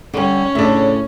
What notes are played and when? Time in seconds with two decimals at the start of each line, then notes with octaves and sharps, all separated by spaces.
0.13 D3 G3 C#4
0.55 A2 C#3 D4 E5